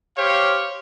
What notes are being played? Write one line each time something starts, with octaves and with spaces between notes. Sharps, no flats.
G4 C5 C#5 F5